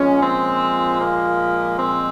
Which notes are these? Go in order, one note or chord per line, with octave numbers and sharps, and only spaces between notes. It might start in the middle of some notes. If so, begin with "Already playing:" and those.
Already playing: A#2 F3 G#3 C#4
C4
A#3
C4